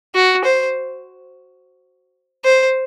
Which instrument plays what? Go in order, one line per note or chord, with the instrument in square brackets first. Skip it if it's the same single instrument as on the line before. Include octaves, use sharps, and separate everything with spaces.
[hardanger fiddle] F#4
C5
C5